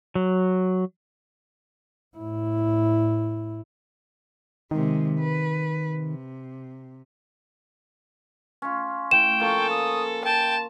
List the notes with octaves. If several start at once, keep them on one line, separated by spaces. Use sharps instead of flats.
F#3
A2 E4
C3 D#3 G#3
B4
C3
C#4 F4
A2 G5 E7
F3 A#3 A4 C#5
D#6
G5 A5